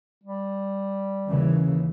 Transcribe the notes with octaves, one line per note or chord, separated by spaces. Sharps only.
G3
D#2 C#3 E3